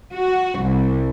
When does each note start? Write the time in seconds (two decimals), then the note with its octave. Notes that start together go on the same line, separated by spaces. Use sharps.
0.14 F#4
0.60 C2